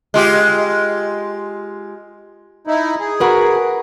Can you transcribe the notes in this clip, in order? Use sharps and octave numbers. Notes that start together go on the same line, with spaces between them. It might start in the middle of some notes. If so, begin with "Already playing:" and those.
G#3 F4 G4
D#4 E4
G#4
F#4 A#4 B4